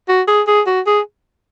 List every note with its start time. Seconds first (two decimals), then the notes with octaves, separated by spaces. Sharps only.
0.08 F#4
0.28 G#4
0.47 G#4
0.67 F#4
0.86 G#4